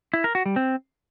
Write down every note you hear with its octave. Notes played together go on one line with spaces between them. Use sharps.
E4
A#4
F#4
G3
C4